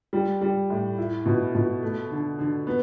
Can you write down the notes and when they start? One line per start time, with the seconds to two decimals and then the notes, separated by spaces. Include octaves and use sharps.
0.13 G3
0.41 G3
0.70 A2
0.98 E4
1.26 B2
1.55 B2
1.83 A3
2.10 D3
2.39 D3
2.67 B3